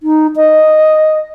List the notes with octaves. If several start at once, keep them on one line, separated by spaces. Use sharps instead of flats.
D#4
D#5